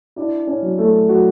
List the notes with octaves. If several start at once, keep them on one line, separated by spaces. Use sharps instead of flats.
D4 E4 D5
C#4 C#5
F#3
A3 A4
F#3 F#4